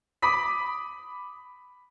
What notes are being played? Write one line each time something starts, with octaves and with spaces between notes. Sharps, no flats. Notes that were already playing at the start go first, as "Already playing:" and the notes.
B5 D6 D#6 B6